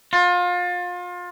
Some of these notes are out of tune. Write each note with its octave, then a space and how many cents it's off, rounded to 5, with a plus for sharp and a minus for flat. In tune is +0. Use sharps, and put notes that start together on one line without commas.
F4 +30